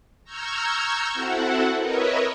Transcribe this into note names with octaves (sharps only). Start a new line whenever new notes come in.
A#5 C#6 E6 F6 G6 G#6
C4 E4 F#4 A4 F#5
A#4 B4 C#5 D#5 E5